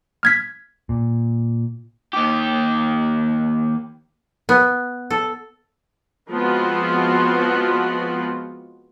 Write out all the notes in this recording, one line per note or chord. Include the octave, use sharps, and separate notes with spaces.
F6 G#6 B6
A#2
D#2 G4
B3
A4
F3 G#3 B3 C4 F4 F#4